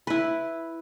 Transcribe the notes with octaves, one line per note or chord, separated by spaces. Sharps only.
E4 B4